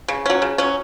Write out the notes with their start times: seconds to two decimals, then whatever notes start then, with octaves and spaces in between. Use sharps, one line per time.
0.08 C#3
0.26 F#3 C#4
0.42 C#3
0.58 F#3 C#4